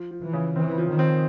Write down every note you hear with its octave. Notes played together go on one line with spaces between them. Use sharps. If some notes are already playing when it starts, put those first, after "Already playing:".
Already playing: F3
F3
E3
C#3
E3 C4
F3
D#3
C4